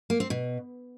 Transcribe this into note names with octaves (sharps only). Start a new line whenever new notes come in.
A#3
C4
B2